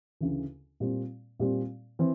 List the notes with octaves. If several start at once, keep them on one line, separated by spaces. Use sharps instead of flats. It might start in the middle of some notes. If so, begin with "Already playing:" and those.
D2 C#3 E3
A#2 G3 C4
A#2 G3 C4
E3 C4